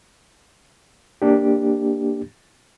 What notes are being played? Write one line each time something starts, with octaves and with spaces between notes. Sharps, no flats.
A#3 D4 G4